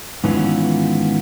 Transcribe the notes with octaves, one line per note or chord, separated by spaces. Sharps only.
G#2 D#3 E3 B3 C#4 F4